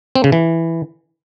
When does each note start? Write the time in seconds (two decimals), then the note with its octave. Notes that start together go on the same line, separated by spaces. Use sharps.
0.16 C4
0.24 C#3
0.32 E3